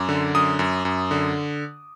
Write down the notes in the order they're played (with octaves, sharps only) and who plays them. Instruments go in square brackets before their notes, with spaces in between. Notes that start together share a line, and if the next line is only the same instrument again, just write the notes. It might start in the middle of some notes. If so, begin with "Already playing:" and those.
Already playing: [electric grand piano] F#2 D6
D3
F#2 D#6
F#2
F#2
D3